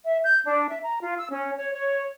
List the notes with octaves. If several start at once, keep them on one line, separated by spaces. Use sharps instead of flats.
E5
G6
D4
E5
A#5
F4
E6
C#4
C#5
C#5